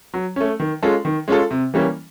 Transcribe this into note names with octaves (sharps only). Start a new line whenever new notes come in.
F#3
A3 C#4
D#3
G#3 C#4 F4 A4
D#3
G#3 C#4 F4 A4
C3
E3 G3 A#3 C#4